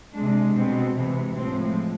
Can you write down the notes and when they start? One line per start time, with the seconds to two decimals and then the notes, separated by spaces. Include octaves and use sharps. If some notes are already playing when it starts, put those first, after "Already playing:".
0.14 C3 G#3 D4
0.55 B2 G#3 C4
0.96 C3 E3 G#3
1.36 A2 F3 G#3 C4